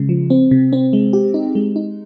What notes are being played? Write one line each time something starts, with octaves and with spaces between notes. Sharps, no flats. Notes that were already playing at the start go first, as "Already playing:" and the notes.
Already playing: C#3 G#3
F3
C4
C3
C4
G#3
G4
D#4
G#3
D#4